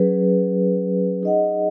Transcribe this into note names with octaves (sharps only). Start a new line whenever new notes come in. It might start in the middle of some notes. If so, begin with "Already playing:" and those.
Already playing: F#3 C#4 G#4 B4
D#4 G#4 D#5 F#5